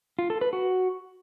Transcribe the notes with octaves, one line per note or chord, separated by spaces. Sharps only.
F4
A4
B4
F#4